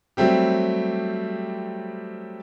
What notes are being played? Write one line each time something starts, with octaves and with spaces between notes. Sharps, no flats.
F#3 G3 A3 C4 G4